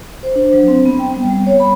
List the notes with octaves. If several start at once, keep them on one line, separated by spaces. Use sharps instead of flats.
C5
D4
F#3
C4
B3
G5
G3
G3
C#5
B5